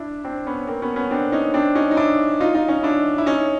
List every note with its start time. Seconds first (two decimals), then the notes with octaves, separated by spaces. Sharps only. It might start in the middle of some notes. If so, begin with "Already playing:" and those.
Already playing: D4 E4
0.24 C4 D4
0.47 B3 C#4
0.67 A#3 C4
0.82 B3 C#4
0.96 B3 C#4
1.11 C4 D4
1.32 C#4 D#4
1.54 C4 D4
1.75 C#4 D#4
1.91 D#4
1.97 D4 E4
2.40 D#4 F4
2.54 D#4 F4
2.68 C#4 D#4
2.83 D4 E4
3.18 E4
3.26 C#4 D#4